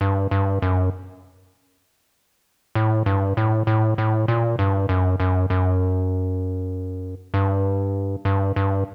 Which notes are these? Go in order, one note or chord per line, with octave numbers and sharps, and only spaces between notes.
G2
G2
F#2
A2
G2
A2
A2
A2
A#2
G2
F#2
F#2
F#2
G2
G2
G2